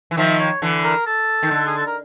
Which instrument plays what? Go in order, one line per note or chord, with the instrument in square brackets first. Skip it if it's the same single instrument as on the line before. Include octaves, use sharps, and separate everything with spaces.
[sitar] E3
[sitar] D#3 F3 [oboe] E5
[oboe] C#5
[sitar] D3 E3
[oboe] A#4
A4
[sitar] D#3
D3
[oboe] G#4
A4
A#4